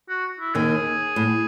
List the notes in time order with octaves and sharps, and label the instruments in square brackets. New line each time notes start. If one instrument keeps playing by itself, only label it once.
[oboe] F#4
E4
[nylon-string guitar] D#2 D#3 [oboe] G#4
[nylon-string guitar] A2